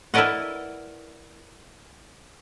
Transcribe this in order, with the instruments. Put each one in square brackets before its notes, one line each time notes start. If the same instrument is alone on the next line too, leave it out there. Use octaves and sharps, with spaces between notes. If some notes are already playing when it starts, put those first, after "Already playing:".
[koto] E4 A#4 B4 D5 D#5 F#5